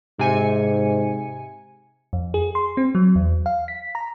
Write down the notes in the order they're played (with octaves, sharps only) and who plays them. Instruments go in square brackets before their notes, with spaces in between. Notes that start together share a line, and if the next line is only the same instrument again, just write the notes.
[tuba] G#2 [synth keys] C3 G#5 C#7
[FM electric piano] F2
G#4
C6
C4
F#3
E2
F5
B6
A#5